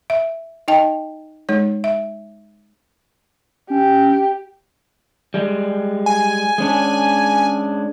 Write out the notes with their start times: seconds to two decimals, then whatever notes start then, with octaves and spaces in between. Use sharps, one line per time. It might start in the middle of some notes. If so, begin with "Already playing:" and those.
0.10 E5
0.68 D#4 D#5 G5 A5
1.49 G#3 D#4 C#5
1.84 E5
3.70 C#4 G4
5.34 G3 G#3
6.06 G#5
6.58 G#3 C#4 D4